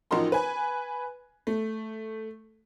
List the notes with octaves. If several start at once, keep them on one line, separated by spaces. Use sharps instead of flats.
A1 F3 D#4 F#4 A#4 C6
B4 G#5
A3